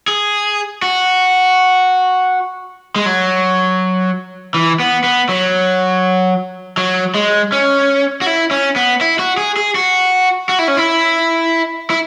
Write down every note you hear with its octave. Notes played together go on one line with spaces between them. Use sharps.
G#4
F#4
G#3
F#3
E3
B3
B3
F#3
F#3
G#3
C#4
F#4
E4
C#4
B3
E4
F#4
G#4
G#4
F#4
F#4
E4
C#4
E4
E4